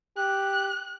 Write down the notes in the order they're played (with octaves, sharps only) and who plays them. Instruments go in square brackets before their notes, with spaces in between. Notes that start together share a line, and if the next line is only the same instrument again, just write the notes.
[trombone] G4 [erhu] F#6